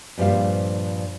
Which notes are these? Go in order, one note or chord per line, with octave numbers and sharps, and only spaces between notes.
G2 A#2 F3 G3 C5 F5